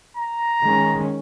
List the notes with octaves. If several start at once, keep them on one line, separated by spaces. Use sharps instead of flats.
A#5
D#3 G#3 C#4